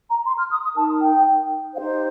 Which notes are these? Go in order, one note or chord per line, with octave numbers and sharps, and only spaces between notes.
A#5
C6
F6
D#6
D#6
D#4 A#4 A5
G5
D#4 G4 C5 F5